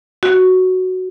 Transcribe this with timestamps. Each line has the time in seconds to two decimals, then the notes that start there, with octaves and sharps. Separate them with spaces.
0.23 F#4